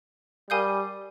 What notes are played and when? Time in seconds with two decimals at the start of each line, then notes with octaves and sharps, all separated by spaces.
0.50 G3 A#4 F5 G#5 D#6 G6